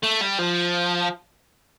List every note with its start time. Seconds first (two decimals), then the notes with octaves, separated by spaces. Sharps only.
0.04 A3
0.22 G3
0.39 F3